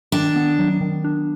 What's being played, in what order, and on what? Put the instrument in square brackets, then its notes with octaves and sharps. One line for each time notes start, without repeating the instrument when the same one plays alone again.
[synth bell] D#3 [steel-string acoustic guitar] D4
[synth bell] B3
F#3
D#3
D4